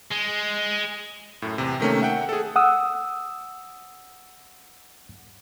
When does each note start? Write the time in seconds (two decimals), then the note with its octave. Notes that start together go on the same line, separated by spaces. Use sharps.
0.12 G#3
1.42 F#2 A2
1.58 E2 C3
1.80 C3 D#3 A3 A#3 C#4
2.02 E5 F#5 G5
2.29 G#4 A4
2.56 F#5 D#6 E6